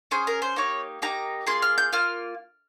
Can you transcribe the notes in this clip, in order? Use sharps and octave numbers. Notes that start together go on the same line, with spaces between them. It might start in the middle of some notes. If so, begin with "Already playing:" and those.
C#4 G#4 C5
A#4
C5
A#3 D#4 G4 C#5
A#3 D#4 G4 A#5
A#3 F4 G#4 C6
F6
G6
A#3 F4 F6